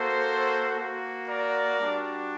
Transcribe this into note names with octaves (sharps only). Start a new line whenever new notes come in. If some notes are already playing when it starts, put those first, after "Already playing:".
Already playing: A#3 F#4 A4 C5
A#3 F#4
A#4 D5
G3 D4 F#4